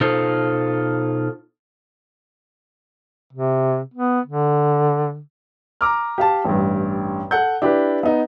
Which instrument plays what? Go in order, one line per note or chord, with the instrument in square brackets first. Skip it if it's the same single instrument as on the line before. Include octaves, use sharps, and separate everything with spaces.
[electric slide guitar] B2 D#4 F4 A4 C5
[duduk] C3
B3
D3
[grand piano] A#5 D6 F6
G4 F5 A5
A1 G2
A4 F#5 G6
D4 E4 G4 B4
B3 D#4